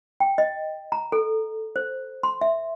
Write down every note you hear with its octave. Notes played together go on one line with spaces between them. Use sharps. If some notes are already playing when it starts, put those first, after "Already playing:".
G5
D#5
A#5
A4
C5
C6
E5